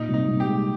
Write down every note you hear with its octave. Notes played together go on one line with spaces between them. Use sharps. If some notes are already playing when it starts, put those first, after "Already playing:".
Already playing: A#2 D#4
C2
D#4
C2
G4
G#3